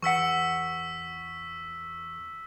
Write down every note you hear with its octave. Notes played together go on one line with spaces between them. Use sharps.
E2 F#5 C#6 E6 B6